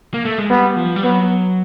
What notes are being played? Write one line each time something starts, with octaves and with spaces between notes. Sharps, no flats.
A#3
A3
G#3
G3 B3
F3
G3
F#3 B3